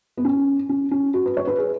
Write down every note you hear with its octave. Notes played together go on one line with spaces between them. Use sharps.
B3
C#4
C#4
C#4
F#4
B4
C#5
B4
G#4